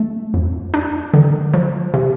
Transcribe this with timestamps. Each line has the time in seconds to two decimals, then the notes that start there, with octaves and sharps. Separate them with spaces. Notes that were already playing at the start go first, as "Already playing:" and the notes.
Already playing: A3
0.34 F2
0.74 D4
1.14 D3
1.54 F3
1.94 C3